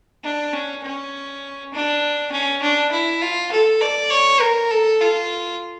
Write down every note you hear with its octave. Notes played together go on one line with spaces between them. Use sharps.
D4
C#4
C#4
D4
C#4
D4
E4
F4
A4
D5
C#5
A#4
A4
F4